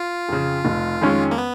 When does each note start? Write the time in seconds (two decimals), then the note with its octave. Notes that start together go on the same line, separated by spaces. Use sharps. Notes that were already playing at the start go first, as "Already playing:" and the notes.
Already playing: F4
0.29 F2 C#3
0.65 F1
1.01 F2 D#3 G#3 C#4
1.31 A#3
1.38 B3